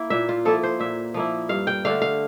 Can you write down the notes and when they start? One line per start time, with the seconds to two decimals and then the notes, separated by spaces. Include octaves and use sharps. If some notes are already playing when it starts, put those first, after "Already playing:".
Already playing: A#3 E4
0.10 A#2 E5
0.29 F4
0.45 F3 A#3 E4 A4
0.63 C5
0.80 A#2 E5
1.14 F3 A#3 E4
1.49 G2 F5
1.67 G5
1.85 D3 A3 D4 F5
2.02 F5